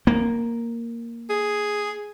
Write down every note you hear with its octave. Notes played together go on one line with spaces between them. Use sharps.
A#3
G#4